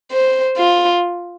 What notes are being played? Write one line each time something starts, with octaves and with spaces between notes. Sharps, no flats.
C5
F4